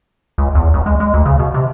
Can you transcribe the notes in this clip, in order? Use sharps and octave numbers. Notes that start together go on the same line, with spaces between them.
C#2
E2
C#2
G#3
G#3
D2
C#3
B2
C3